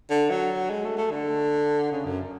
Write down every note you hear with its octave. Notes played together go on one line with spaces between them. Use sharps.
D3
F#3
G#3
A3
A3
D3
C#3
F#2